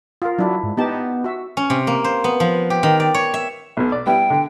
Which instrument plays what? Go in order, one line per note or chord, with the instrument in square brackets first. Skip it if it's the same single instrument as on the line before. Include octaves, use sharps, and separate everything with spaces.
[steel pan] F4 A#4
[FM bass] F#3 [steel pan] D4 E4
[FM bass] G#2
[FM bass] B3 [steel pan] D#4 G4 A5
[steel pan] F#4 E5
[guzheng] C#4
C3
A#3
C5
B3
F3
G4
D#3
D5
C#5
E5
[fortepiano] B1 B2
D5
[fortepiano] G3 B3 E4 [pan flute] G5
[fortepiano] D3